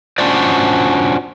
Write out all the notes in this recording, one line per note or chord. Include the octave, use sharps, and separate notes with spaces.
C#4 D4 F4 F#4 C5 D5